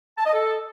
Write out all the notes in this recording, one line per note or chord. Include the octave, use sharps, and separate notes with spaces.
A5
D#5
A4